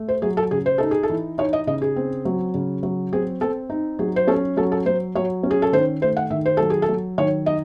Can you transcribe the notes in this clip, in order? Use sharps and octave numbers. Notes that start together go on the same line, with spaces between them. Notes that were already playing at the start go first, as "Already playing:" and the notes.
Already playing: A3
C5
F#3 G#4
A4
C#3 G#4
C5
D#4 A4
G#4
A4
E3
D#4 C#5
D#5
C#3 D#5
G#4
C4
F#3
C#3
F#3
C4 G#4
C4 A4
D#4
F#3 G#4
C5
C#4 A4
F#3 A4
A4
F#3 C5
F#3 C#5
C#4
G#4
A4
D#3 C5
A3 C5
F#5
D#3 E5
C5
F#3 A4
G#4
A4
F#3
D#3 C#5
D#4 D#5